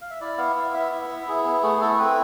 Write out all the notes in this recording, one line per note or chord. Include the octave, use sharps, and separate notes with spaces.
F5
E5
E4 D5
B3 F5
E4 F5
B3 E5
E4 E5
B3
E4 G#4
B3
A3 G#4
E4 A4
C4 B4